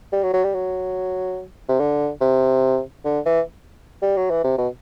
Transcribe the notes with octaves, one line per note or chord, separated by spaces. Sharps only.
G3
F#3
F#3
G3
F#3
C3
D3
C3
D3
E3
G3
F#3
E3
C3
B2